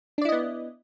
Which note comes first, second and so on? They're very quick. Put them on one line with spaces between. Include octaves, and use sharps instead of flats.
D4 D5 E4 D#5 B3